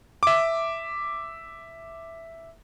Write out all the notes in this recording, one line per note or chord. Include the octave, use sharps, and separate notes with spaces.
E5 D6